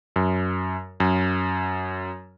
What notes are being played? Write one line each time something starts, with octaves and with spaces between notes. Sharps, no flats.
F#2
F#2